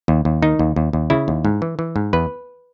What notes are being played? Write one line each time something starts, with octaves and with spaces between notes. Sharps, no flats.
D#2
D#2
D#3 D#4
D#2
D#2
D#2
C#3 E4
D#2
G#2
E3
E3
G#2
E2 B4